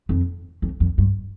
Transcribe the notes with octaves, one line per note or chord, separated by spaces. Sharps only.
F2
F2
F2
G2